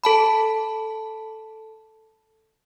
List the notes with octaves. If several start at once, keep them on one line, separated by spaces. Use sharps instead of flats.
A4 A5 B5